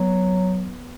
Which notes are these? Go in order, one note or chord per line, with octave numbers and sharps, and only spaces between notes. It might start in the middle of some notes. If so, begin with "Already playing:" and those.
Already playing: F#3 B3